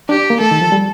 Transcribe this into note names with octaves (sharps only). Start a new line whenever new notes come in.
D4 G4
A#3
A3 A4
D#3
F3
G3